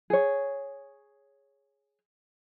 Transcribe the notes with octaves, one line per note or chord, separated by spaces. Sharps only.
G#4 C#5